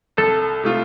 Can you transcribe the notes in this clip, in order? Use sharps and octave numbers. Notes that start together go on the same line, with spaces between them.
C2 A4
C3 A3 F4